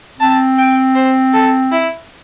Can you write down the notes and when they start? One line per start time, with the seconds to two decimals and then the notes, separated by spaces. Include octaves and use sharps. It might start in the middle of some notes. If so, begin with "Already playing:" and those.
0.20 C4 A5
0.58 G5
0.95 C5
1.33 A4
1.72 E4